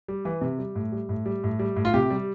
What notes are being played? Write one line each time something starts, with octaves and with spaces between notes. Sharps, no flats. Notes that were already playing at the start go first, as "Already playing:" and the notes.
G3
E3
C3
G3
A2
G3
A2
G3
A2
G3
A2
F4
C3 G4
G3